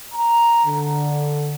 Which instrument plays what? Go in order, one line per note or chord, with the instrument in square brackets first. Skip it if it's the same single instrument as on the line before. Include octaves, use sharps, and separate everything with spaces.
[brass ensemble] A#5
D3